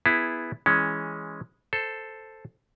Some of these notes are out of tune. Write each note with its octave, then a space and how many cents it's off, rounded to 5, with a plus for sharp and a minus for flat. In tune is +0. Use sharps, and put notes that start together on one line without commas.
B3 +0 E4 +0 G#4 +0
E3 +0 G#3 +0 C#4 +0
A4 +0 C5 +0